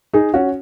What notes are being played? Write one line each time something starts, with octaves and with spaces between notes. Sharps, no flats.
D#4 G#4
C#4 F#4